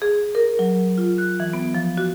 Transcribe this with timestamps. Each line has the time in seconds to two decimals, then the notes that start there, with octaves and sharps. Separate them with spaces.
0.02 G#4
0.35 A#4
0.59 F#3
0.98 F4
1.18 F#6
1.40 E3
1.53 B3
1.74 F3
1.97 F#4